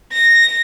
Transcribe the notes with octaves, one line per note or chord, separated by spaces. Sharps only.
A#6